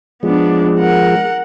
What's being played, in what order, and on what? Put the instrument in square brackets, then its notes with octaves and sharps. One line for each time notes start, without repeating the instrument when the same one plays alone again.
[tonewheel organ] F3 G#3 [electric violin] B3 D4
[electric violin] A#4 F#5